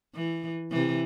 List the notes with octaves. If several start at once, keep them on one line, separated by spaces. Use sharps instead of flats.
E3
C3 E3